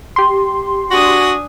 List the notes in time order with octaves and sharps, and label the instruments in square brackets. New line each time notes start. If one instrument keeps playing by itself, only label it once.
[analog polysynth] G4 C6
[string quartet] D4 G#5 D#6 [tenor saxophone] F#4